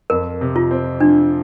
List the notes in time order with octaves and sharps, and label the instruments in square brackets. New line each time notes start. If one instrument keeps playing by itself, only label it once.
[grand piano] F2 [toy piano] A#4
[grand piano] C3
[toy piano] F4
[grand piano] C4
[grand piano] F3 [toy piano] D4